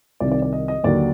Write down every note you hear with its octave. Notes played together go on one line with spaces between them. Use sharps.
C2 C3 D#3 D5
D5
D5
D#5
D#5
D#2 D3 F#3 A#3 D5